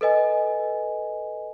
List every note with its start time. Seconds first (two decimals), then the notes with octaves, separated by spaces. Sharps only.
0.01 A4 B4 D#5 G#5